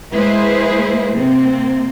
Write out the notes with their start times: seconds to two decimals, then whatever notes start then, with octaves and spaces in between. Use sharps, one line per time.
0.12 G#3 A#3 E4 G#4 B4 C5
1.16 C3 A#3 C4